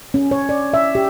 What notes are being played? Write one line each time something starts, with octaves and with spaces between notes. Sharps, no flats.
C#4
C#5
D5
E5
G4